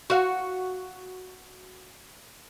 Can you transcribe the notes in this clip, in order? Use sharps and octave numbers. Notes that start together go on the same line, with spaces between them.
F#4 F5